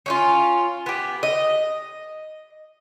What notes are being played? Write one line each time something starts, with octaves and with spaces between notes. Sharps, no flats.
C#4 D#4 F4
B3 G4
D#5